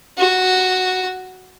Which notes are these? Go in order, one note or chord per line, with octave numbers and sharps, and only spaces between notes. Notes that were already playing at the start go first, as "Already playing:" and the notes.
F#4